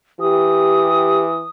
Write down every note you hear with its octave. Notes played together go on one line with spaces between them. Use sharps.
E3 G4 D#6